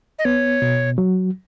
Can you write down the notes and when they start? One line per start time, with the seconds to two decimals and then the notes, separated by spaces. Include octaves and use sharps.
0.19 D#5
0.25 B3 C#5
0.62 B2
0.98 F#3